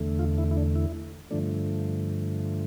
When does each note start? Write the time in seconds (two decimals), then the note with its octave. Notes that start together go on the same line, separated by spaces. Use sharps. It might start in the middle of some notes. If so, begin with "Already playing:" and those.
Already playing: E2 D3 A3
0.19 F4
0.38 E4
0.51 E4
0.57 D4
0.76 E4
1.31 G2 D3 F3 A3 D4